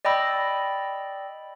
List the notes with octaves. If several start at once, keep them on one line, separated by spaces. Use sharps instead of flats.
D5 D#5 G5 B5 E6